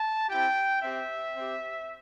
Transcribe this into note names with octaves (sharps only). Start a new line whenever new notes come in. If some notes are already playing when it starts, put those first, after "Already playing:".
Already playing: A5
C4 E4 G4 G5
C4 G4 E5
C4 G4